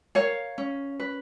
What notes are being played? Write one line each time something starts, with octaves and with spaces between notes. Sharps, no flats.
A#4 C#5 F5
C#4
B4